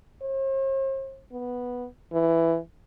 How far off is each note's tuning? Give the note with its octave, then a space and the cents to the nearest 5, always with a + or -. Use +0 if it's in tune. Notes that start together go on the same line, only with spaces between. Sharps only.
C5 +45
B3 -5
E3 +10